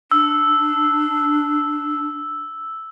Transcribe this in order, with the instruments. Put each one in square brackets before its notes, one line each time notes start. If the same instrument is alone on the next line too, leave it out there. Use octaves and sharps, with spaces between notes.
[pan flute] D4 [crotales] E6